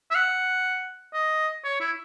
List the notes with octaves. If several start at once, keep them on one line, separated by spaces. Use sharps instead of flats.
E5
F#5
D#5
C#5
E4